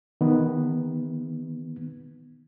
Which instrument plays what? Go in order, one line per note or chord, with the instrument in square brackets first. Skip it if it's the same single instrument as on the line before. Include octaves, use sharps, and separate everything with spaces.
[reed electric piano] D#3 B3